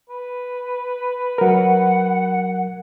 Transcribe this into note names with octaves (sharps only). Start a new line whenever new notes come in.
B4
F#3 A#4 F#5